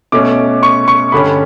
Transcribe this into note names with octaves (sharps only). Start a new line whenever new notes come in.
B2 A3 C#4 D6
C#6
C#6
G2 D3 G3 C#4 B5